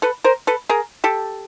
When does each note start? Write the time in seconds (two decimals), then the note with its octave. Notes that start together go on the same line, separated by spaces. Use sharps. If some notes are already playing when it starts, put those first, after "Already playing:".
0.02 A4 B4
0.24 A#4 C5
0.47 A4 B4
0.69 G#4 A#4
1.04 G4 A4